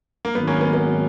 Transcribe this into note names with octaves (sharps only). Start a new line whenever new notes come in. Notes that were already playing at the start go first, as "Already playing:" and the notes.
A#3
G#1 G#2 D#3 F#3 B3
A#3 C#4
B3
B3